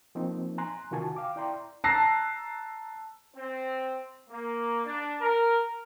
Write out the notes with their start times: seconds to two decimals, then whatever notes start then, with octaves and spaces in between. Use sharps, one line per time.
0.15 F3 A#3 C4 D#4
0.58 G#5 A#5 C6 F#6
0.91 C3 D#3 F4 F#4 G#5 A5
1.16 F5 G5 D6
1.36 E4 D5 G5 A#5 C6
1.84 A5 A#5 E6 F#6 A#6 C7
3.37 C4
4.30 A#3
4.85 D4
5.21 A#4